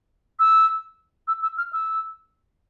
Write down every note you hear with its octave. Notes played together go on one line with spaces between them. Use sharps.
E6
E6
E6
F6
E6